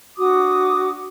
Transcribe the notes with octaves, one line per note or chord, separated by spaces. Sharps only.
D4 F#4 D6 D#6